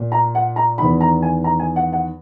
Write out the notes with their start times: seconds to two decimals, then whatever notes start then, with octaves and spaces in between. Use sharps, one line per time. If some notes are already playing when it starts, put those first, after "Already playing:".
Already playing: A#2
0.12 A#5
0.35 F#5
0.56 A#5
0.78 E2 D#3 B5
1.01 A#5
1.22 G#5
1.44 A#5
1.60 G#5
1.76 F#5
1.93 F#5